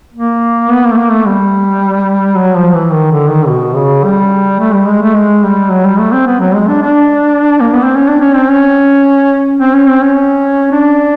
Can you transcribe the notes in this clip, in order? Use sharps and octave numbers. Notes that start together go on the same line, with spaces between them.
A#3
B3
A#3
A3
A#3
A3
G3
F#3
F3
E3
D#3
D3
D#3
B2
C#3
G3
A3
G3
G#3
A3
G#3
G3
F#3
G3
A3
C4
B3
F#3
G#3
D4
D4
A#3
B3
C4
C#4
D4
C#4
C4
C#4
C4
C#4
C4
C#4
D4